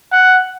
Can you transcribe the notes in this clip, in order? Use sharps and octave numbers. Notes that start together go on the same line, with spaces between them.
F#5